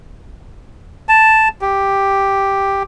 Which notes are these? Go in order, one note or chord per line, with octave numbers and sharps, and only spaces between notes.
A5
G4